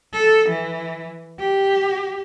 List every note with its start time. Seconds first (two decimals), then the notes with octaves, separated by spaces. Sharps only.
0.13 A4
0.49 E3
1.39 G4